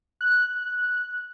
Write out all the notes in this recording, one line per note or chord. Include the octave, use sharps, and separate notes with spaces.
F#6